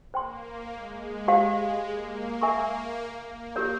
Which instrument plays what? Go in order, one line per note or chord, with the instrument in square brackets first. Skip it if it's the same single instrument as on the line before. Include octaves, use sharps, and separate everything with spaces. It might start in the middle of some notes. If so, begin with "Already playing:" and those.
[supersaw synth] A#3 [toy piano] C5 G5 C6
[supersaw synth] G#3
[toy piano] G4 C5 F5
[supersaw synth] A#3
[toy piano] A#4 E5 G#5 C#6
[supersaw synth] A#3
[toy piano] G4 A#4 C#5